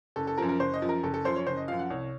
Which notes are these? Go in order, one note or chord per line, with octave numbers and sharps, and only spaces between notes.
F#1 A4
A4
F#2 F3 A#4
A#4
F#1 C5
D#5
F#2 F3
A#4
F#1 A4
A4
F#2 F3 C5
C#5
F#1 C5
D#5
F#2 F3 F5
F#5
C2 C#5